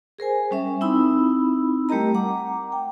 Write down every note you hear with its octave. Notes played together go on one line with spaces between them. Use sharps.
G#4 A#4 C5 G#5
G3 C#4 E5
C4 D#4 E4 B5 E6
G3 A3 G4 A#4 D#5 A#5
F#5 A#5 D6
G5